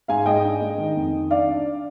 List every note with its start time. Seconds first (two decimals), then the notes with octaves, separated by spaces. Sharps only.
0.08 G#2 F5 G#5
0.26 G#3 D#5 G5
0.44 D4
0.61 G#3
0.78 D#3
0.97 F2
1.13 D#3
1.30 D4 D5 F5
1.48 D4